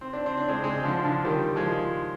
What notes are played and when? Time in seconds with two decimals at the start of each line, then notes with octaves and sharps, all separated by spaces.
0.01 C4
0.13 D4
0.26 C4
0.37 D4
0.48 G#3 C4
0.64 G#3 C4
0.84 D3 F3
1.05 D3 F3
1.25 D#3 G3
1.56 F3 G#3